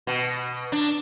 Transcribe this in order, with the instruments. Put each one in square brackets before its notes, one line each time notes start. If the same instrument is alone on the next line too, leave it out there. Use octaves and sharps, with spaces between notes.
[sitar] B2
D4